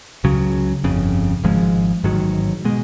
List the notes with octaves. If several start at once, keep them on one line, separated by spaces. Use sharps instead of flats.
C#2 C#3 F#3
G1 F2 C#3
G#1 G#2 F3 G#3
A1 G#2 D#3 F#3
B2 G#3